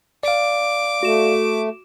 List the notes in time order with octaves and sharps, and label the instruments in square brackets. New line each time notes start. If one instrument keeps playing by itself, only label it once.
[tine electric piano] D5 F5 [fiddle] D6
[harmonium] A3 [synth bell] F#4 E7